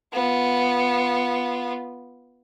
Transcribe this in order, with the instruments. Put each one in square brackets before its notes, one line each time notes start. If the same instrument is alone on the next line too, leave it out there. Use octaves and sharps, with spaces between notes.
[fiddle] B3 F4